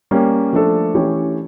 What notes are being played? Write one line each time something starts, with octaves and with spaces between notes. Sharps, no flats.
G3 A#3 C#4
F3 A3 D4 A4
E3 A3 C#4 G4 C#5